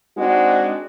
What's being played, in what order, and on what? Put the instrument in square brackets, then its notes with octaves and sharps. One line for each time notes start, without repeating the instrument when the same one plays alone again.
[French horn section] G#3 C4 D4 D#4 F#4